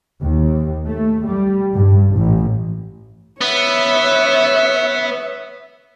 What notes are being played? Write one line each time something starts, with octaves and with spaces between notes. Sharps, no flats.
D#2
A3
G3
G2
A1
B3 C#5 E5